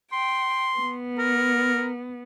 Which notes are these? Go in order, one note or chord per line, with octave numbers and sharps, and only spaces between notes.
G5 C6
B3
A#4